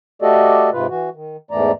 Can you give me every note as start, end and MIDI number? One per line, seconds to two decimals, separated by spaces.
0.22 0.70 57
0.22 0.70 66
0.22 0.70 67
0.22 0.70 69
0.22 0.70 74
0.22 0.70 75
0.73 0.87 44
0.73 0.87 48
0.73 0.87 65
0.73 0.87 71
0.89 1.09 52
0.89 1.09 66
1.14 1.37 51
1.51 1.72 40
1.51 1.72 44
1.51 1.72 52
1.51 1.72 57
1.51 1.72 74
1.51 1.72 82